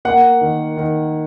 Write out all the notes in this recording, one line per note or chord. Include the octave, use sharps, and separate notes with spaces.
A#3 F#5
D#3
D#3